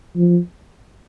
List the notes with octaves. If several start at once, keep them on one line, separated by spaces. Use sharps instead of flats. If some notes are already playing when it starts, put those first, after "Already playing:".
F3